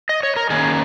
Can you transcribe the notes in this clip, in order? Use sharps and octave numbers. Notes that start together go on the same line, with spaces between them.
D#5
C#5
A#4
D#3 A#3 C#4 G#4